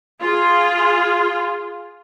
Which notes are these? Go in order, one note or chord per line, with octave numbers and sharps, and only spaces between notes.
F4 G#4